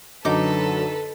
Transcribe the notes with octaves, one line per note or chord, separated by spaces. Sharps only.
F#2 D3 F#3 D#4 A4 B4 D6